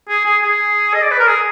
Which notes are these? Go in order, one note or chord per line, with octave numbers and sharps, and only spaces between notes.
G#4
G#4
G#4
D#5
D5
B4
A#4
G#4